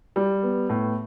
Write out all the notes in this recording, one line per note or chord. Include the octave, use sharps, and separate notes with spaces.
G3
B3
A2